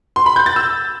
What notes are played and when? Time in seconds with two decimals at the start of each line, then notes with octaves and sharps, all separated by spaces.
0.16 C6
0.26 B5
0.36 G6
0.46 A6
0.56 E6